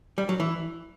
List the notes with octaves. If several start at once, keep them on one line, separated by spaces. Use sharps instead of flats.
G3
F#3
E3